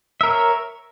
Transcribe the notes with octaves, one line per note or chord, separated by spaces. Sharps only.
A#4 C#5 E5